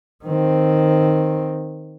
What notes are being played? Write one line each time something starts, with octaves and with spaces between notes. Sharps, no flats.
D#3 C4